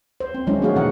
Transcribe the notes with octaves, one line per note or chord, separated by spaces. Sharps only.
C5
C4
D#3 F#3 G#3 C#4 D4 E4
A3 C4 F#4 G#4 F5
B2 E3 D#4 F#5